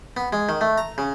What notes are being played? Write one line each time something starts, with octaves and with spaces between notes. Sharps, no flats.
B3
G#3
D#3
A3
A#5
C#3